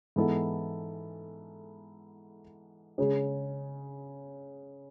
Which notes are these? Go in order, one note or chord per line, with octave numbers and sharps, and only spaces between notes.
G#2 E3 B3 E4 A4
C#3 G#3 C#4 G#4